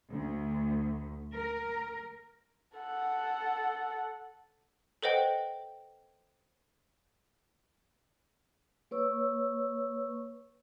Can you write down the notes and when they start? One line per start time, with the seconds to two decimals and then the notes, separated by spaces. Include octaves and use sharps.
0.11 D2
1.33 A#4
2.77 A4 F#5
5.02 A4 B4 C5 D#5 F#5 G5
8.91 A#3 B4 C#5 C#6 E6